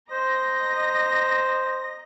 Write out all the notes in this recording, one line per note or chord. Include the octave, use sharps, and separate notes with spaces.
C5 D#5 A#5 A#6